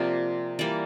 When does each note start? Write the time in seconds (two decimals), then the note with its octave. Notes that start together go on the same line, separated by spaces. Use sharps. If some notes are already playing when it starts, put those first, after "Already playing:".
Already playing: C3 F3 A#3 D5
0.59 E3 G3 A#3 D5